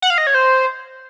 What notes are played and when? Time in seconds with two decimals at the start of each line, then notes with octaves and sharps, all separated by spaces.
0.02 F#5
0.10 F5
0.18 D#5
0.27 C#5
0.35 C5